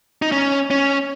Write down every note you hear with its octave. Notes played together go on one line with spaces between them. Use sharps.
D#4
C#4
C#4